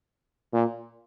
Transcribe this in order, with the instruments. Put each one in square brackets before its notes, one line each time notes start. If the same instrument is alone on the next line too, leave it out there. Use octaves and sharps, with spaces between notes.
[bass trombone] A#2